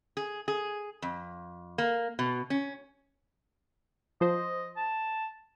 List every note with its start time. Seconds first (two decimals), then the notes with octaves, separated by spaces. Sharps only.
0.17 G#4
0.48 G#4
1.02 F2
1.78 A#3
2.19 B2
2.50 C#4
4.21 F3 C5 D#5
4.77 A5